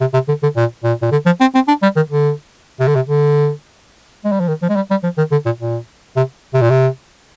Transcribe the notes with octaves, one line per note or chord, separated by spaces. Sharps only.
C3
C3
D3
D3
A#2
A#2
A#2
D3
F3
C4
C4
D4
G3
D#3
D3
C3
D3
C3
D3
G#3
G3
F3
D#3
F3
G#3
G3
G3
F3
D#3
D3
A#2
A#2
C3
C3
A#2
C3